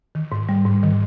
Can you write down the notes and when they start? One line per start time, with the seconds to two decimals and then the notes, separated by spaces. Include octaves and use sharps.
0.15 D#3
0.32 G#2
0.49 G3
0.66 G#2
0.83 D#3